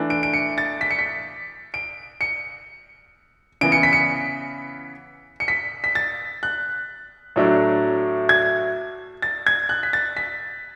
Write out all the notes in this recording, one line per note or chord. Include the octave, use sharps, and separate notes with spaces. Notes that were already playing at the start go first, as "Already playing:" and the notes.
Already playing: E3 A3 D4
D7
D7
C#7
A6
B6
C#7
B6
D7
C#7
C#3 E3 B3 D7
C#7
B6
C#7
C#7
B6
B6
A6
F#6
A2 F#3 A3 D4
G#6
A6
G#6
F#6
B6
A6
B6